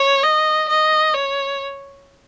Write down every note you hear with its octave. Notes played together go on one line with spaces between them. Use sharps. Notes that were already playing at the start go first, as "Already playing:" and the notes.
Already playing: C#5
D#5
D#5
C#5